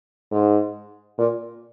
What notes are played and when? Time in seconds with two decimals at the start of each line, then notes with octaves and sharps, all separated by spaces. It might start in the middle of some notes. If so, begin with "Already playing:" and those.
0.32 G#2
1.18 A#2